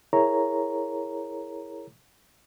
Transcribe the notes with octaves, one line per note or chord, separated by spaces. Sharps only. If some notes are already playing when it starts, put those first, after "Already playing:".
E4 G#4 A#4 C#5 A#5